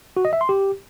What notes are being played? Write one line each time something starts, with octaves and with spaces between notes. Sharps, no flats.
F#4
D#5
E5
C6
G4